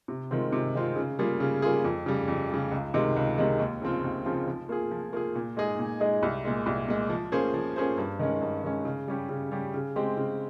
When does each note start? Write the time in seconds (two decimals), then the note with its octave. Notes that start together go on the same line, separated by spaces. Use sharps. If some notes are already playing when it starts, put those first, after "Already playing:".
0.08 C3
0.31 D#3 G#3 C4 F4
0.53 C3
0.75 D#3 G#3 C4 F4
0.96 C#3
1.19 G3 A#3 F4 G#4
1.40 C#3
1.62 G3 A#3 F4 G#4
1.85 F2
2.06 C#3 G3
2.28 F2
2.50 C#3 G3
2.71 C#2
2.94 C3 D#3 G#3
3.16 C#2
3.38 C3 D#3 G#3
3.59 D#2
3.82 C#3 F3 C4 F4
4.04 D#2
4.25 C#3 F3 C4 F4
4.48 F3
4.69 A#3 F4 G#4
4.91 F3
5.13 A#3 F4 G#4
5.35 A#2
5.57 G#3 D#4 G#4 D#5
5.79 A#2
6.00 G#3 D#4 G#4 D#5
6.23 C2
6.45 A#2 G#3
6.66 C2
6.88 A#2 G#3
7.10 F3
7.32 A#3 C#4 G#4 C5
7.54 F3
7.76 A#3 C#4 G#4 C5
7.98 G2
8.19 D#3 G#3 C#4
8.41 G2
8.64 D#3 G#3 C#4
8.85 C#3
9.08 G3 C#4 G4
9.29 C#3
9.52 G3 C#4 G4
9.74 C#3
9.96 G#3 C4 G4
10.17 C#3